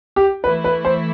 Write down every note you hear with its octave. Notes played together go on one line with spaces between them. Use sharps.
G4
E3 A3 E4 B4
B4
C5